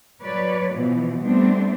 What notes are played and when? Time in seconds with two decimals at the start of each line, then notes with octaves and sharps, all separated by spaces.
0.22 F#3 B4 C#5 D5
0.73 B2 E3 F3 B3
1.22 G3 A3 B3 C4 D4